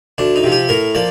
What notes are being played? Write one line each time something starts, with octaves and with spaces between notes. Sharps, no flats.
D2 D4
D#4
C3 F3
G4
A2 A#4
F3 A#3 D5